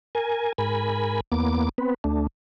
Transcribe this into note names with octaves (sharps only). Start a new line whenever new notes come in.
A#4 G#5
G#2 A#4 G#5 B5
E2 A#3 B3 D6
B3 C4 B4
D2 A3 D4